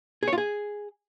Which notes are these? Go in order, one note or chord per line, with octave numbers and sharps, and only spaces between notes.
G#4
C#5
F4
G#4